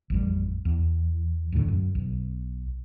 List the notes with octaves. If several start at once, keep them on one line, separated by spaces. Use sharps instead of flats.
A1 F2 G3
E2
D1 E2 A2 D3
F#2
B1